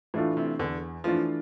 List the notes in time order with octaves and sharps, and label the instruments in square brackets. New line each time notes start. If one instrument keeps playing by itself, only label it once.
[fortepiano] A2 [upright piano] E3 A3 D4 F4
[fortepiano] C3
[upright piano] E2 [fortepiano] D3
[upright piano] E3 A3 D4 F4 [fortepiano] F3